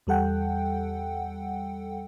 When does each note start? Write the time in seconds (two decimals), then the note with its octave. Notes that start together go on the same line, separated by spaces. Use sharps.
0.07 E2 G3 A4 F#5 G5